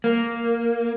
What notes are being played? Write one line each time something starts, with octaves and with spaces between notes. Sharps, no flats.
A#3